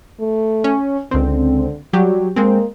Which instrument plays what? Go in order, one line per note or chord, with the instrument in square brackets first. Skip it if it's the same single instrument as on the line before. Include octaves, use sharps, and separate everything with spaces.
[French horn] A3
[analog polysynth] C#4
[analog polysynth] C#2 C4 [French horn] D3
[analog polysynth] F#3 G4 [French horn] G3
[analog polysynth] G#3 C4 [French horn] A#3